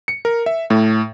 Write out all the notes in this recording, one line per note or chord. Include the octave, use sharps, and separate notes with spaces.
C#7
A#4
E5
A2